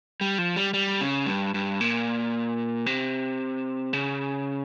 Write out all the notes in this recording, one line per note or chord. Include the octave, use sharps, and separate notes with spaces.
G3
F3
G3
G3
C#3
G2
G2
A#2
C3
C#3